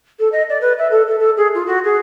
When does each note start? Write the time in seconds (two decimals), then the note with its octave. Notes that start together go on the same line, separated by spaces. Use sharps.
0.19 A4
0.32 D#5
0.49 D5
0.61 B4
0.78 E5
0.91 A4
1.07 A4
1.19 A4
1.37 G#4
1.54 F4
1.66 F#4
1.84 G#4